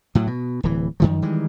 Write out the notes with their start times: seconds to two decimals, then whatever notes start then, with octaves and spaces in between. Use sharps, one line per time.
0.15 A2 F#3
0.27 B2
0.63 D1 E3
1.00 F#2 D#3 F3
1.22 D#3 E3 G3 G#3